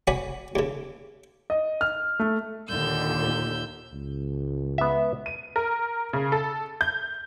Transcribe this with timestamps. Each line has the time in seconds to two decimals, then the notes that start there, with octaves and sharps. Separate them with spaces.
0.07 F#4 C#5 D5 G#5 B5
0.56 D#2 C#3
1.50 D#5
1.81 F6
2.19 A3
2.68 D#2 A#2 D3 E6 G6
3.93 C#2
4.78 B3 E5
5.26 D#7
5.56 A#4
6.13 C#3
6.32 A4
6.81 G6